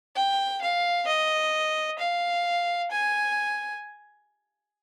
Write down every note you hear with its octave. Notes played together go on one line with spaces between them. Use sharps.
G5
F5
D#5
F5
G#5